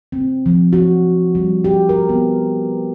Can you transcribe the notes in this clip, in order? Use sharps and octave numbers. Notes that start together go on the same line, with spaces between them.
C4
F3
F#4
G3
G4
A#4
B3